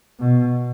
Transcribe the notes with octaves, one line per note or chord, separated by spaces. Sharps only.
B2